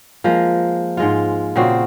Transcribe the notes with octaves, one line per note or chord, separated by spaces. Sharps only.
F3 G#3 A#3
G#2 G#3 F4
A#2 C#3 C4 F#4